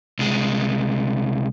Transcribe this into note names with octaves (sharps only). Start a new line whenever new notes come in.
C2 G#3